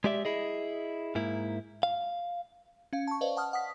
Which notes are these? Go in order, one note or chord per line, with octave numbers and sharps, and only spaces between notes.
G#3 G4 D5 E5
E4 G#4 D#5
G#2 A#3 E4
F5
C#4 F5
A5 C#6
B4 C5 D5 D#5 F5
F#5 A5 D#6 F6
F#5 D#6 B6